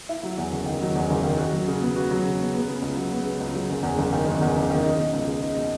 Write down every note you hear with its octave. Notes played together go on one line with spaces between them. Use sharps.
E4
F#3
E2
F#1
D#3
F#3
E2
F#1
D#3
F#4
F#3
C#3
B3
F#4
F#3
C#3
B3
B3
C#3
C#2
F#3
B3
C#3
C#2
F#3
F#1
E2
F#1
D#3
F#1
E2
F#1
D#3
D#4
B2
C#2
G#3
D#4
B2